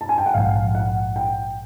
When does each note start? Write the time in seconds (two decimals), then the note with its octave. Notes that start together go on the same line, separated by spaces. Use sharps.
0.01 A5
0.09 G#5
0.18 G5
0.26 F#5
0.34 A#1 G#2 F3 F5
0.75 F#5
1.16 G5